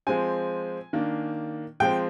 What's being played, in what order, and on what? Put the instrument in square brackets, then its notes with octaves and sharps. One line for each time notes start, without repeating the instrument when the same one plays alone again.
[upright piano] F3 G#3 C4 G#5
D#3 A#3 D4
F3 G#3 C4 G5